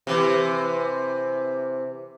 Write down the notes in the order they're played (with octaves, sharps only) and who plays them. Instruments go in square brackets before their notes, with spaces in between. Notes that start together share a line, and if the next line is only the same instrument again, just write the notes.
[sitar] C3 E3